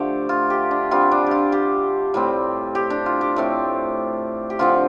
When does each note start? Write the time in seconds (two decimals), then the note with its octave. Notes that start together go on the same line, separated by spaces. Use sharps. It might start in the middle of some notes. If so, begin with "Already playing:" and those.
Already playing: D3 F3 A3 G4
0.29 F4
0.50 G4
0.71 D4
0.91 D3 G3 C4 F4
1.11 D4
1.27 F4 G4
1.52 G4
2.14 A2 G3 C4
2.75 G4
2.90 D4
3.06 F4
3.21 G4
3.36 A2 A3 C4
4.50 G4
4.59 D3 F3 C4 F4